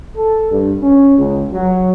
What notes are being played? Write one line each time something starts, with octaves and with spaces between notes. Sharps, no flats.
A4
G2
C#4
C#2
F#3